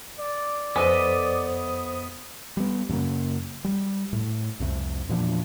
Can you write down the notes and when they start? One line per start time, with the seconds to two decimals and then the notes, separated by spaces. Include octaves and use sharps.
0.19 D5
0.76 F2 B3 A4 B4 C5 D#5 G#5 D#6
2.57 G3 B3
2.89 F#2 C#3 F#3 A#3
3.64 G3
4.13 A2
4.60 C2 F2 C3
5.09 E2 A#2 F3 D4